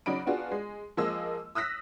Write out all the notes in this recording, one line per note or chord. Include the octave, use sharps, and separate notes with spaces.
C#3 F#3 D#4 D5 B5 D7
B3 D4 F4 F#4 G#4
G#3
F3 G#3 A#3 D#5 E6
D#6 E6 F#6 A#6 B6